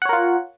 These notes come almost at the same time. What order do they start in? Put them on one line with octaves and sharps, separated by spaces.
F#5 C#5 A#4 F4